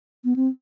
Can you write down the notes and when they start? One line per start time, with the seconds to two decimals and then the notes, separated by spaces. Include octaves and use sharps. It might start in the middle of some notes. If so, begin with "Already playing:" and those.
0.25 B3
0.36 C4